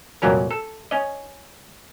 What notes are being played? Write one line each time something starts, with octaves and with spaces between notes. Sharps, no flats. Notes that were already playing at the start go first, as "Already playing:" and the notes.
C2 F2 A#2 F#3 C#4 A#4
A4
C#4 D#5